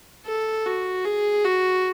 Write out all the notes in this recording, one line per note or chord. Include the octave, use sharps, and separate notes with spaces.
A4
F#4
G#4
F#4